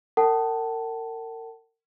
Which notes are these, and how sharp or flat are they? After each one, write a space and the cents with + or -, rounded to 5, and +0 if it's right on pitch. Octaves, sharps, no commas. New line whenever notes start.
A#4 -40 F#5 +45 A5 +0